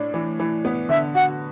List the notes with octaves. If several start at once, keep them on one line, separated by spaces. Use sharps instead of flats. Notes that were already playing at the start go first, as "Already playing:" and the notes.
Already playing: A2 D4
E3
E3
B3
D3 E5
F#4 F#5